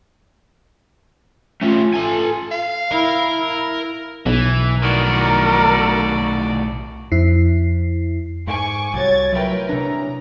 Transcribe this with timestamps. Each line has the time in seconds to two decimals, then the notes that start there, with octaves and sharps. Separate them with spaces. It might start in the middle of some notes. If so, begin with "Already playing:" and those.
1.63 A3 C#4 F4
1.94 A4 G#5
2.51 F5
2.91 E4 A#4
4.26 B1 E3
4.82 A2 D#3 F#4 A#4 D5
7.12 F2 E4 C7
8.47 G#2 G#5 C#6 D6
8.94 C2 F#3 C#5 G#6 A6
9.32 D2 F#3 E4 F4 A#4 B4 G5
9.69 C3 E3 D4 C#5 A#5